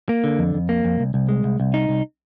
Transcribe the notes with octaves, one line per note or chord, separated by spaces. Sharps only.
A#3
D3
F2
F2
A#3
F2
C2
C2
G#3
C2
C2
D#4
C2